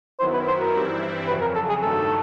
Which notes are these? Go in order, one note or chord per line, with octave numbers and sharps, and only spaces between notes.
F#2 D#3 F#3 B3 E4 C5
B4
C5
A#4
G2 E3 G3 C4 E4
F2 C#3 F#3 B4
A#4
A4
G#4
G2 D#3 F#3 A3 A4